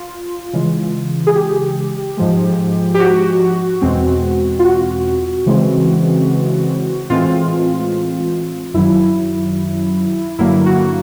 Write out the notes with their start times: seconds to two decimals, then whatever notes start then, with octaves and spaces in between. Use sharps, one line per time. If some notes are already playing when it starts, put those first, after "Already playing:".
Already playing: F4
0.53 C#3 E3 G#3
1.27 G#4
1.35 G4
2.17 G#2 F3 G#3
2.94 G4
3.00 F#4
3.81 E2 B2 G#3 C4
4.59 F4
4.65 F#4
5.46 C#3 E3 G#3 C4
7.10 A2 E3 G#3 C4 F4
8.74 F#2 D#3 F#3 E4
10.39 G2 D3 F#3 A#3 E4
10.66 F#4